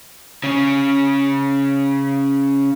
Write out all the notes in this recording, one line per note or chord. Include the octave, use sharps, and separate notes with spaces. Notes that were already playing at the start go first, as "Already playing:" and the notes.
C#3 C#4